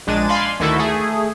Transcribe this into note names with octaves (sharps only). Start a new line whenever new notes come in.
A#1 G#3 D4 A6 D#7
D5 F5 G#5 B5 C6
D2 D#3 E4 F#4 A4 E5
A3 G#4